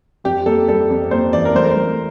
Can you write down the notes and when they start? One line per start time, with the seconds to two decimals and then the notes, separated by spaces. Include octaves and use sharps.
0.24 F2 G4
0.46 A#3 A4
0.68 G3 A4
0.90 F2
1.11 A#3 C5
1.33 E3 D5
1.45 A#4
1.55 A3 C5
1.64 A#4
1.71 C5
1.77 A3